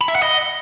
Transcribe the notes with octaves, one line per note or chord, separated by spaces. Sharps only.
B5
E5
F#5
D#5